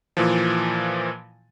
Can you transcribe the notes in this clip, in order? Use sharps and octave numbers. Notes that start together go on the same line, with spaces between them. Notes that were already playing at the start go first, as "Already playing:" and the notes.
A#2 E3 F3